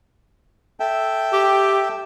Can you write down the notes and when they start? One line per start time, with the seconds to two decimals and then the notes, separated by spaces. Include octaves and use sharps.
0.80 A4 E5 G5
1.33 G4